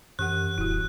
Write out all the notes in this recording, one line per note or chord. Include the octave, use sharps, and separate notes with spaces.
F#2 E3 G4 F#5 F#6
D#1 E4 F#4